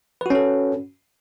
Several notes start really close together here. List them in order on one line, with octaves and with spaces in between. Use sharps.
B4 F#4 C#4 A4